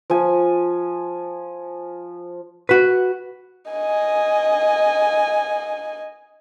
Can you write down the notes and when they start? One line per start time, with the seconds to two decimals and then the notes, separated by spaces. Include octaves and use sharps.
0.10 F3 G#5
2.69 F#4 B4
3.71 D#5 G#5